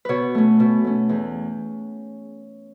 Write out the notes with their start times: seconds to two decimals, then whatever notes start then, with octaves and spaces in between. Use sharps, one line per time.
0.05 B2 B4 C#5
0.35 A3 C#4
0.60 B2
0.85 A3 C#4
1.09 E2 G#4